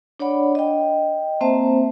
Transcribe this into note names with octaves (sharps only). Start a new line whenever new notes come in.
D4 C#5 D5 F#5 B5
D#5 G5
A#3 C4 C5 E5 A5